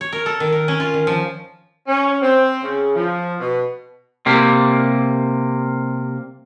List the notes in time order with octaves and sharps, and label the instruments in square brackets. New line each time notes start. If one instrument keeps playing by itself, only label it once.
[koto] C#5
A#4
A4
D#3
A#4
C#4
F4
D#3
F3
[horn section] C#4
C4
C#3
F3
B2
[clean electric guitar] C3 G3 A#3